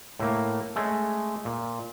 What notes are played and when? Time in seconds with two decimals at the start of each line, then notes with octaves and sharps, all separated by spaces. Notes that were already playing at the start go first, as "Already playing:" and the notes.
0.19 A2 A3 A#3
0.76 G#3 A3 C#4
1.45 A#2